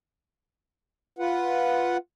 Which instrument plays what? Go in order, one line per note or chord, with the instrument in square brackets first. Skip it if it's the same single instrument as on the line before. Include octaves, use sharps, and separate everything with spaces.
[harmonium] F4 B4 F#5